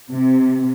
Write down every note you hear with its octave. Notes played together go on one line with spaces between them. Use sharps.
C3